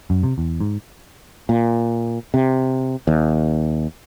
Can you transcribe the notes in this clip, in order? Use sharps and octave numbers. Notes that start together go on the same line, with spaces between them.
F#2
C3
E2
G#2
A#2
C3
D#2